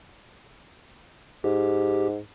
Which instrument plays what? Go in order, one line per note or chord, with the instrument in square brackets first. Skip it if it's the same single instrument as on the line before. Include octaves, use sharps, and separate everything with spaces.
[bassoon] G#2 [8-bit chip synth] G4